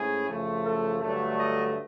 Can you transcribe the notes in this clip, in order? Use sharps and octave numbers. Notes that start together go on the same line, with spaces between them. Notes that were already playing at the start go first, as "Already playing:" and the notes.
Already playing: G#2 A3 C#4 E4 G#4
F#2 C#3 F3 A3
A4
G2 D3 F#3 A3
D#5